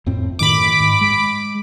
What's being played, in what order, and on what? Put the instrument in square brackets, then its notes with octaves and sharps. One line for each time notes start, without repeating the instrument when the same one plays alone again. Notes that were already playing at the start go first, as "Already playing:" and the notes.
[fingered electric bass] F2 A2 C4
[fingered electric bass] F#2 A2 D#3 [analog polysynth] B5 D6
[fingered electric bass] G#2
G#3